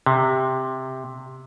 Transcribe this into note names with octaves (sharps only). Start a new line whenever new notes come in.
C3